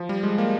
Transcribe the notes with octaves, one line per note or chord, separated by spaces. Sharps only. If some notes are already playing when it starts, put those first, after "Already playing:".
Already playing: F3
G3
G#3
A#3